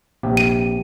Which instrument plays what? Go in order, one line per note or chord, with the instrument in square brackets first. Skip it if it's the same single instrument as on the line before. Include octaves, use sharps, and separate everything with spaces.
[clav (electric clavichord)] A#1 C3 G4
[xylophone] D#7